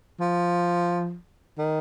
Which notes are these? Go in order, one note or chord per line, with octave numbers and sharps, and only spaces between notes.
F3
D#3